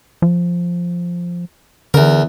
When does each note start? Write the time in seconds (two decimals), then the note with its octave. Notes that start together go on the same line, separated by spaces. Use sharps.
0.22 F3
1.94 E2 D3 A#4